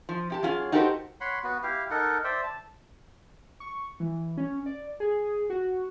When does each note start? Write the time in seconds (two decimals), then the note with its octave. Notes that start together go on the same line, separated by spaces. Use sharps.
0.09 F3
0.30 C3 G4 A5
0.43 F#3 C#4 F4 G#4
0.72 D#4 F#4 G4 A4 A#4 C5
1.21 C#5 F#5 B5 C6
1.44 B3 F#4
1.63 E4 G4 F5
1.90 D#4 A4 A#4 F#5
2.24 C5 D5 E5 G5
2.44 A5
3.60 C#6
4.00 E3
4.37 C#4
4.66 D5
5.00 G#4
5.50 F#4